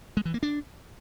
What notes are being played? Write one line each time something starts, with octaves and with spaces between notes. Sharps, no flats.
G#3
E3
A#3
D4